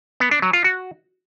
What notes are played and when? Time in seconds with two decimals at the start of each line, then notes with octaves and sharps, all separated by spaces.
0.20 B3
0.31 D4
0.42 F#3
0.53 F4
0.64 F#4